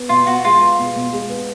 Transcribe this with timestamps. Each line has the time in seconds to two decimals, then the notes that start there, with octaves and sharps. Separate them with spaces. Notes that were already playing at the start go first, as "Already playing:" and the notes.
Already playing: B3
0.09 B2 F4
0.27 B2 F#4
0.44 G#3 F4
0.61 B3
0.78 B2
0.96 B2
1.13 G#3
1.29 B3